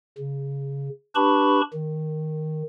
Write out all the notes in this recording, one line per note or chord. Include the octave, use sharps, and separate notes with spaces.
C#3
D4 G4 B4 A5 B5 C#6
D#3